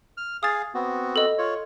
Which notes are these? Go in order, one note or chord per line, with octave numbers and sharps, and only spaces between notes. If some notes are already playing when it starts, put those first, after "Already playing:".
F6
G#4 F5 D#6 A6
B3 C4 F#4
A4 D#5
F4 C#5